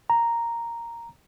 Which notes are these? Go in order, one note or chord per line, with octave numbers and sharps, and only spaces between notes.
A#5